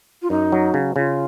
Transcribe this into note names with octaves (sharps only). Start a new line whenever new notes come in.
F4
F#2 D#4
F#3
C#3
C#3 F4